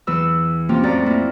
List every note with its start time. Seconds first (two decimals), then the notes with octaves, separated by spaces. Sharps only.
0.07 E2 E3 B4 E6
0.69 F3 A#3 C4 C#4 F4 G4
0.83 F2 A2 F#4 D5 A#5
1.06 A#3 E4 A#4